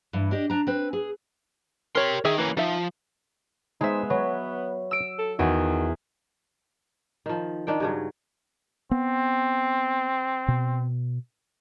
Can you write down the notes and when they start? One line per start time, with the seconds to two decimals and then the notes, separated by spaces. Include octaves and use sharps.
0.13 G2 E3
0.31 D4 G4 D#5
0.50 D4 A#5
0.67 C4 B4
0.93 G#4
1.95 G4 A#4 C#5 C6
2.25 D#3 G#4 E5 G5
2.38 E3 A#3 C#4
2.57 F3 D#4 E5
3.81 G#3 B3 D#4 C5 E5
4.10 F#3 B4 C#5
4.91 E6 D7
5.19 A4
5.39 E2 D#3 F#4
7.26 D#3 F3
7.67 D#3 D4 G5
7.80 G2 C#3 F#3
8.91 B3 C4
10.48 B2